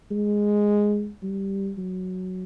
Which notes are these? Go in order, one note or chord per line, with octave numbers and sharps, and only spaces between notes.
G#3
G3
F#3